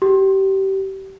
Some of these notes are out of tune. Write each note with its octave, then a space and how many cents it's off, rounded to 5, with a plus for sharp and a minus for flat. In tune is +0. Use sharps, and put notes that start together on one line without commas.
G4 -25